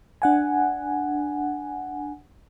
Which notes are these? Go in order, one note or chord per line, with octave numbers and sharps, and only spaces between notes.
D4 F#5 G#5